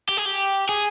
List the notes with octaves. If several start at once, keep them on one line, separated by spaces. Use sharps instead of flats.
G4
G#4
G4
G#4